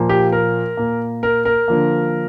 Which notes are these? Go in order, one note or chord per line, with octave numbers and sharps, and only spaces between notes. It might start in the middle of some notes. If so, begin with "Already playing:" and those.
Already playing: A#2 F3 A#3
G4
A#4
A#2 A#3
A#4
A#4
D3 F3 A#3